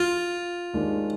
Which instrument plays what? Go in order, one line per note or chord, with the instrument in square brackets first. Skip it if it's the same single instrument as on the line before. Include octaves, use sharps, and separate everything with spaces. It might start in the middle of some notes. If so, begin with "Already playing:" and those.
Already playing: [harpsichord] F4
[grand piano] D#2 D#3 G#3 D4